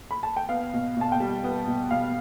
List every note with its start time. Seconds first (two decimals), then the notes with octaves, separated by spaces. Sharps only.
0.11 B5
0.23 A5
0.37 G5
0.49 B3 F5
0.74 B2
0.96 B2 A5
1.12 G5
1.20 G3
1.44 B3
1.67 B2
1.91 B2 F5